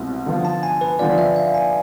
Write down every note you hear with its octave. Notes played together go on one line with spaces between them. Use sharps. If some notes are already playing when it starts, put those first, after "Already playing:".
Already playing: C2 B2 G#3 C4
D3 F3 B3 F4
A5
G#5
B4
D3 F3 B3 F4 D5
E5
F5
G#5